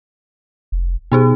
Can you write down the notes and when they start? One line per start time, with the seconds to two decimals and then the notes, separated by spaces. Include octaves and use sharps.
0.72 F1
1.12 B2 B3 D#4 G#4